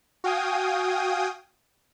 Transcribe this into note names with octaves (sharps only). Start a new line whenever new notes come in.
F#4 F5 G5 G#5 D#6